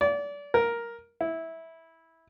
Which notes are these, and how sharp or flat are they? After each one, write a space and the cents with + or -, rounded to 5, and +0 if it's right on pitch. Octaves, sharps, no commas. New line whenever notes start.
D5 -30
A#4 +5
E4 -15